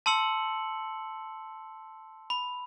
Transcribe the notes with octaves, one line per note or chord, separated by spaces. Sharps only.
A5 C6 E6 C#7 F#7
B5